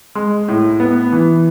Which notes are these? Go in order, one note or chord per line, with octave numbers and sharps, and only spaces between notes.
G#3
A2
B3
E3